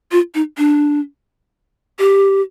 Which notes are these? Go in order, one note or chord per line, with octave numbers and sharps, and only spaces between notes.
F4
D#4
D4
G4